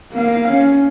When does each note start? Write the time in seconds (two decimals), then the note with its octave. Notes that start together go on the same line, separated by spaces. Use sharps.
0.13 A#3 F5
0.52 C#4